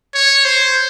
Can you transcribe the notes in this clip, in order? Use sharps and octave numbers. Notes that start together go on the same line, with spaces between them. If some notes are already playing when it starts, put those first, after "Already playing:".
C#5
C5